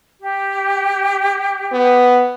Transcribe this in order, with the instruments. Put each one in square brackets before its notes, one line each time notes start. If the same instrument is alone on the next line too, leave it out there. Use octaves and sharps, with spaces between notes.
[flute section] G4
[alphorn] B3